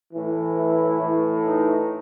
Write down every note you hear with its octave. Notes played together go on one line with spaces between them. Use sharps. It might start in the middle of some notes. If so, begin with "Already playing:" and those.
A2 E3
E4
A2 E3
D#4